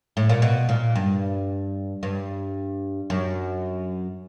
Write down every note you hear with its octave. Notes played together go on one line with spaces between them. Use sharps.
A2
A#2
B2
A#2
G2
G2
F#2